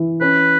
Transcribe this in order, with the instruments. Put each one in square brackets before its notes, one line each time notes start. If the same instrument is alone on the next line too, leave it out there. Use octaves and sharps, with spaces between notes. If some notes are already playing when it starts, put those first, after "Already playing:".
Already playing: [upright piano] E3 E4
[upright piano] C#4 [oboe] B4